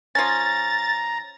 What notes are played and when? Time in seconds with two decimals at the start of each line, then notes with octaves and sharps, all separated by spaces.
0.15 F3 C#4 A#5 A6